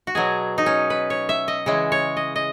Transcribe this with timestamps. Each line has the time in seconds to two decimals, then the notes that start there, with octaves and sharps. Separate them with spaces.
0.07 F#4
0.15 B2 F#3 G#4
0.58 D#4
0.66 C#4
0.90 B4
1.10 C#5
1.29 E5
1.48 D#5
1.66 C#3 E3 G#3
1.92 C#5
2.17 D#5
2.36 D#5